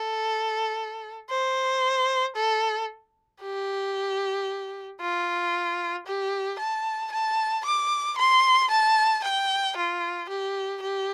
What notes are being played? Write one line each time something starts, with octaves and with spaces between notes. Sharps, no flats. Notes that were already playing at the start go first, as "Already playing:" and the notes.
Already playing: A4
C5
A4
G4
F4
G4
A5
A5
D6
C6
A5
G5
F4
G4
G4